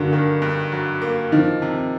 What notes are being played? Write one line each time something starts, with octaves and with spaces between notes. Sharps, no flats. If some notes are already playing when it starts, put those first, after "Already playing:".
Already playing: G2 D3 F#3 A#3
D#3
G2
F#3
A#3
D#3 F3
C3